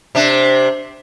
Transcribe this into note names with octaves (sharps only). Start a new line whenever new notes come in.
C3 D4